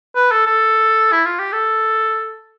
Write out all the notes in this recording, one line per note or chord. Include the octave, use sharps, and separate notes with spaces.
B4
A4
A4
E4
F4
G4
A4